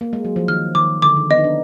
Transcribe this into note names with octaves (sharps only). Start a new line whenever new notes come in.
A#3
G#3
F#3
F3
D#3 F6
D#3 D6
D3 D6
D#3
B3 D#5
D#4
D4